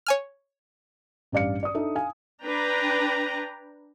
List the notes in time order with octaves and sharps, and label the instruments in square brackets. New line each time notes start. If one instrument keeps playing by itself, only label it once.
[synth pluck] C#5 G#5 F6
[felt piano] A1 G2 D5 F5 C#7
D5 D#6
D4 D#4 A4 E5
F5 G#5
[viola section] D4 B4 G5 A#5